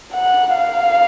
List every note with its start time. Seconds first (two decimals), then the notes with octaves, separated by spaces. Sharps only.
0.14 F#5
0.56 F5